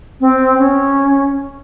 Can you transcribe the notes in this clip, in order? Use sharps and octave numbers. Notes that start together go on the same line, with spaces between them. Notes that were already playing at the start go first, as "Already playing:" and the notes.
C4
C#4